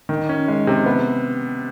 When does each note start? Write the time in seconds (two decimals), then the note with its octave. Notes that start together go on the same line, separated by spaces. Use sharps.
0.09 D#3
0.29 C#4
0.48 G#3
0.67 C3
0.86 B3